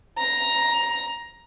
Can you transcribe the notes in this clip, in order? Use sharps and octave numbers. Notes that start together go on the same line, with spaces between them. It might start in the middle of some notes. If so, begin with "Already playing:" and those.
A#5